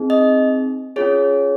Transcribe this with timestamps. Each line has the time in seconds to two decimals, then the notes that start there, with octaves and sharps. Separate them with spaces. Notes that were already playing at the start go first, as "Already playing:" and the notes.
Already playing: C4 D#4 G#4
0.10 D#5
0.96 C#4 F4 G#4 C#5